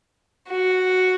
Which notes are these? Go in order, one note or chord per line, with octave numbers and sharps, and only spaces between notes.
F#4